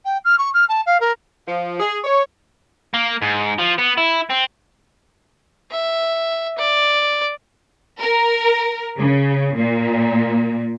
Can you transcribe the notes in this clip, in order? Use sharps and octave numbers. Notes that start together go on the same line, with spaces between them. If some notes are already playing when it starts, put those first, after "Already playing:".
G5
F6
C#6
F6
A5
F5
A#4
F3
G#4
C#5
A#3
G#2
F3
B3
E4
C4
E5
D5
A#4
C#3
A#2